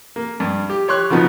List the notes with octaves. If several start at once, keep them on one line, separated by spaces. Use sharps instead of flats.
A#3
G2
G4
G4 C#5 C6 C#6 F#6
C#3 F3 F#3 B3 D#4